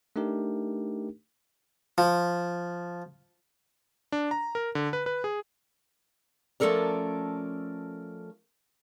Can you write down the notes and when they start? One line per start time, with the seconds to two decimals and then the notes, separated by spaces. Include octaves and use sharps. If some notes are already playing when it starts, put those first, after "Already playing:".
0.16 A3 D4 D#4 G4 A#4
1.98 F3
4.12 D4
4.31 A#5
4.55 A#4
4.75 D3
4.93 B4
5.06 B4
5.24 G#4
6.60 F3 A3 C#4 A4 A#4 D5